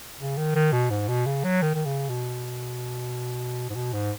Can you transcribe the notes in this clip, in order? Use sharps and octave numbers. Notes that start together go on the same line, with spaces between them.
C#3
D#3
D#3
B2
G#2
B2
C#3
F#3
D#3
D#3
C#3
B2
G#2
B2
G#2